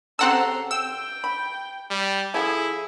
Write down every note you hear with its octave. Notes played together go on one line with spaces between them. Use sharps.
C#3 C4 G4 A4 F#5 A#5 C6 E6
G5 E6
B5
G3
F3 E4 G#4 A4 G#5